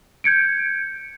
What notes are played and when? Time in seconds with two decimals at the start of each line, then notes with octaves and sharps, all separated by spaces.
0.24 G6 G#6 C#7 D7